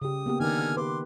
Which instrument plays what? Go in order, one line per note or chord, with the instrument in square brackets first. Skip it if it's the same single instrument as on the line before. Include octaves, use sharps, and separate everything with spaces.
[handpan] C#3 G4 [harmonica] D#6
[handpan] A#3 B3 G4
[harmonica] D3 G#5 F6 [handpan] D#3 D#4 A#4
[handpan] G4 B4 [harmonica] C6 D6